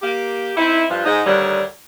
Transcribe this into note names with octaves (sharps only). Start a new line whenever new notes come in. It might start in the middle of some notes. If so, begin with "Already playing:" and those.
A#3 G4
C4 D#4 E4
G2 F3
G#2 D#4
D2 D3 D#3 G3 C#5